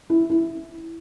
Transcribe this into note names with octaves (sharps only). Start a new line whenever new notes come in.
E4
E4